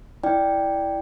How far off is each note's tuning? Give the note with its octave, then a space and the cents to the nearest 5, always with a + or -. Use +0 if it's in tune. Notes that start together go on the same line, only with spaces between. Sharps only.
E4 +0 D5 +0 G5 +0